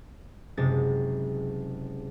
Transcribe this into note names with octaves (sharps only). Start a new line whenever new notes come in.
F#1 C3 G#3 A6